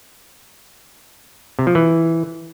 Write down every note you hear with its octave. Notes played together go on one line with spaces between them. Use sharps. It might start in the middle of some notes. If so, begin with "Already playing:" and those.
C3
F3
E3